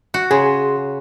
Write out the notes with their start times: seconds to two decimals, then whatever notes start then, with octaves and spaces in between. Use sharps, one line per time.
0.14 F#4
0.31 C#3 G#4 C6